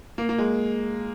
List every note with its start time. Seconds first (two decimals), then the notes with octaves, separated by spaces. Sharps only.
0.18 A#3
0.29 A#3
0.38 G#3